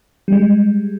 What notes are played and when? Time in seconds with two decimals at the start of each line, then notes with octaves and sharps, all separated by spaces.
0.28 G3
0.32 G#3